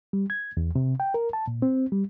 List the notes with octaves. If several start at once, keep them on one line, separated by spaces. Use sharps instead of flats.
G3
G#6
E2
C3
G5
A#4
A5
A#2
C4
G3